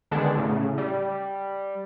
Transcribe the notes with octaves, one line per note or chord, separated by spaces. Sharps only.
D3 D#3 G#3 B3 D4
A2 C#3
G3